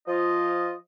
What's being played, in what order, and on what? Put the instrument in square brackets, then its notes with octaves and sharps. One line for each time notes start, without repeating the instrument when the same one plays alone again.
[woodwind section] F3 F4 D#5